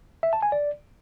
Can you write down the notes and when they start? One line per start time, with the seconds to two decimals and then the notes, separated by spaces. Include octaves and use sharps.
0.23 E5
0.33 A5
0.42 G#5
0.52 D5